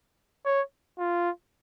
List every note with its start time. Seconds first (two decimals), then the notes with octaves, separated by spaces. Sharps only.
0.46 C#5
0.99 F4